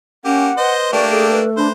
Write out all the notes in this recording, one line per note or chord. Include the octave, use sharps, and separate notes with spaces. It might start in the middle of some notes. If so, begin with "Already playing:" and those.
A#3 C#4 G4 F#5
B4 C5 D#5
A3 A#3 D4 G4 D5
G#4 A4
B4
D4 B4 C5 A#5